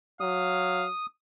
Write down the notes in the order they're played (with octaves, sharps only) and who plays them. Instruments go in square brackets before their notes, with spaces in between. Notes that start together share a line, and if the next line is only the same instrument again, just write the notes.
[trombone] F#3 [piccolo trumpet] F5 [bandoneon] D#6